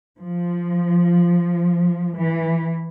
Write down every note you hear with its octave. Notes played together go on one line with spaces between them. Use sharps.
F3
E3